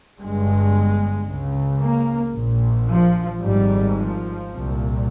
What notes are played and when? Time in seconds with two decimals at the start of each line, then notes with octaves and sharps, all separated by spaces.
0.19 G1 G2 G#3
1.27 C#2 C#3
1.81 A#3
2.34 A#1 A#2
2.87 F3
3.41 G#1 G#2 G3
3.96 F3
4.49 C2 A#2